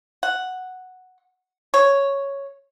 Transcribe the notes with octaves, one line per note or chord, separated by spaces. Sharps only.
F#5
C#5